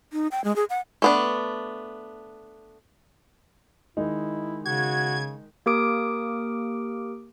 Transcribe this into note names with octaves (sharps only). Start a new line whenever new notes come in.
D#4
G5
G#3
G#4
F#5
A3 B3 D4
D#3 G#3 D#4 E4
C#3 F#4 G#6
A#3 G4 A#4 D6 D#6 D7